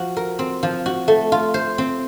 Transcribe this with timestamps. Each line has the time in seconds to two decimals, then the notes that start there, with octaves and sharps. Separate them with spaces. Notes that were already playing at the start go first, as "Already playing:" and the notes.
Already playing: F3 F#4
0.17 A#4
0.39 C4
0.63 F3
0.86 F#4
1.08 A3
1.32 F4
1.54 C5
1.78 C4